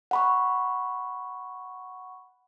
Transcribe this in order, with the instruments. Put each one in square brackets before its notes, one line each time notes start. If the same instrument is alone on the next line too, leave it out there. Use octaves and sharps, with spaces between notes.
[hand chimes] F#5 B5 C#6